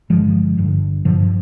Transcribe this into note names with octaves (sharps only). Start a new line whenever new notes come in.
G1 G2 D3 F3 G#3
G1 G2 D3
G1 G2 D3 F3